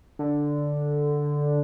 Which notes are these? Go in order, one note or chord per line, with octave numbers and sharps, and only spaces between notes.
D3